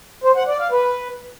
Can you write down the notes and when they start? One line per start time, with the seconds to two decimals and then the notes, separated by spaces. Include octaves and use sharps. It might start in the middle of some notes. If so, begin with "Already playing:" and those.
0.24 C5
0.36 F#5
0.48 D5
0.59 F5
0.71 B4